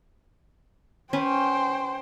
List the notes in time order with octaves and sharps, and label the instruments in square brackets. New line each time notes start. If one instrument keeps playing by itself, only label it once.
[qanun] C#4 B4 [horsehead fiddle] C5 G5